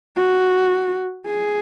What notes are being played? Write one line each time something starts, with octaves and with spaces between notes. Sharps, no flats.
F#4
G#4